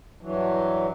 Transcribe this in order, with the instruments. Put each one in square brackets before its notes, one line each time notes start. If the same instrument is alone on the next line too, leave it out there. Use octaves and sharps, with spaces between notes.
[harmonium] G2 E3 F#3